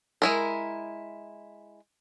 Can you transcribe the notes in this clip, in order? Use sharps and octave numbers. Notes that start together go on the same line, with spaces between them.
G#3 E4 A#4